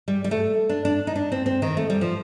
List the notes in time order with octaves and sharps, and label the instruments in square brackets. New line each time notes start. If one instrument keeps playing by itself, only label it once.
[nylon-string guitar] G3
G3
A3
D4
D4
D#4
D4
C4
C4
D#3
A3
G3
F3